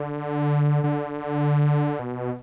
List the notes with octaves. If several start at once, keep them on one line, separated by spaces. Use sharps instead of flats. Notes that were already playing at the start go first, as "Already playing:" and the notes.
Already playing: D3
D3
B2